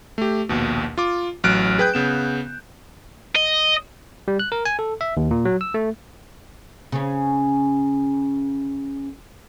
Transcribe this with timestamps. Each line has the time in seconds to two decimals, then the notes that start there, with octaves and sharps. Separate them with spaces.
0.18 A3 G4
0.49 A#1 D#2 B2
0.98 F4 D6
1.44 A1 F#3 F6 F#6 D7
1.79 G#4 B4 G5 F#6 G6
1.94 C#3 B3 E7
3.35 D#5
4.28 G3
4.39 F#6
4.52 A#4
4.65 G#5
4.79 A4
5.01 E5
5.17 D#2
5.31 A#2
5.45 F#3
5.61 E6
5.74 A3
6.92 C#3 C#4